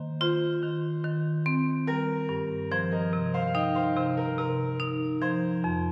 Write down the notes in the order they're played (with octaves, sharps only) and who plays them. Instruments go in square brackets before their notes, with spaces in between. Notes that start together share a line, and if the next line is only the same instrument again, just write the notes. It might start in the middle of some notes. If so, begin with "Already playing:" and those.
Already playing: [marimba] D#3 A#3 [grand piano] C5
[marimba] F4 [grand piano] C5
[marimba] D#3
D#3
C4
[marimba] G3 [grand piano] A#4
[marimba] G2
[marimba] F3 [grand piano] C5
[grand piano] A#4 D#5
[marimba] C3
[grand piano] C5 F5
F5
[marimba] D#4 [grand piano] D#5 G5
[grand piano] C5 F5
[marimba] C3 [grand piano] C5
[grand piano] A#4
[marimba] C3 [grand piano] A#4
[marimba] D#4
[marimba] F3 [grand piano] C5
[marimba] F2